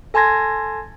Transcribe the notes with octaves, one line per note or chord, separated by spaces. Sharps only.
A4 G#5 A5 C6 G#6 A#6